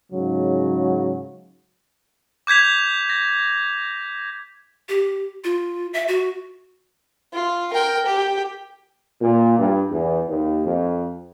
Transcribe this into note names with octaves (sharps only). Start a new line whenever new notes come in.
G#2 C#3 F#3
D6 G6 G#6 B6 F7
A#6
G4
F4
E5
F#4
F4
A#4 G5
G4
A#2
G2
E2
D#2
F2